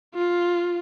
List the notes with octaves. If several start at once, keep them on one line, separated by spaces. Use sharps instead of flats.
F4